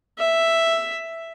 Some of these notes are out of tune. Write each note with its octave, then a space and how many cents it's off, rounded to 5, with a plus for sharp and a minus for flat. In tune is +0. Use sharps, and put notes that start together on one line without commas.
E5 +5